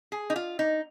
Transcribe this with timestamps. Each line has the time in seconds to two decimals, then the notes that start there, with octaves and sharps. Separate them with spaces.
0.12 G#4
0.30 D#4
0.36 F4
0.59 D#4